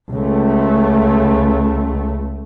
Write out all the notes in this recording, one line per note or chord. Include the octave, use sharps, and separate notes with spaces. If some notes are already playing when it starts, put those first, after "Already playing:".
C#2 A3